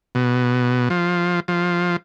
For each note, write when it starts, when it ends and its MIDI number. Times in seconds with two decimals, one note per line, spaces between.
0.15 0.89 47
0.90 1.40 53
1.48 1.96 53